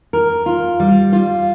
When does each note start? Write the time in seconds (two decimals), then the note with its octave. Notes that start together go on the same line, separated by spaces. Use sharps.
0.13 A#4
0.46 F4
0.80 G3
1.13 F4